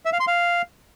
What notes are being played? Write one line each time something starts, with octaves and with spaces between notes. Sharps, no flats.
E5
F5
C6
F5